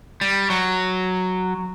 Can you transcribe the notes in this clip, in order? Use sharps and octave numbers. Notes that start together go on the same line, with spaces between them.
G3
F#3